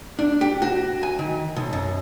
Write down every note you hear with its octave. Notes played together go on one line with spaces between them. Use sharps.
D4
G4
F#4
G#5
D#3
B1
F#2